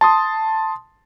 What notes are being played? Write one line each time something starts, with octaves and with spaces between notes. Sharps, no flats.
A5 C6 D#6